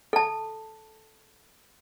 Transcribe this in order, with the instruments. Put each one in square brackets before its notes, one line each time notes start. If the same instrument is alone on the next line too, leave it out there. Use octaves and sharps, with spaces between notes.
[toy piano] A4 A5